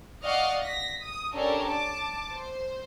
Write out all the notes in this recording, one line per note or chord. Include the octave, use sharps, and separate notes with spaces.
D5 D#5 F5 F#5 C#6 F6
A#6 B6
D#6
C#4 D4 G4 A4 A#4
A5 D6
C5